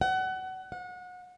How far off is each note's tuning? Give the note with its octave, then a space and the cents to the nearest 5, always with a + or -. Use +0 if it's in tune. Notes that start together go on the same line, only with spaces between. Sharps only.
F#5 +25
F#5 -30